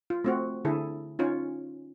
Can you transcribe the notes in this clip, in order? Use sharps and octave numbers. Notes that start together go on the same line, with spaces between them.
F4
A3 C4 F#4
D3 E4 G#4 A4
C#4 D#4 F4 C#5